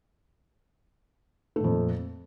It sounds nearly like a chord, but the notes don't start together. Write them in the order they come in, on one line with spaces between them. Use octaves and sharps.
A3 A#2 F2